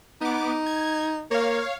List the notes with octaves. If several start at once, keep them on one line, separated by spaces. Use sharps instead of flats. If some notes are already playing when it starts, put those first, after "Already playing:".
B3 D#4 D6
G#6
A#3 C#5 F5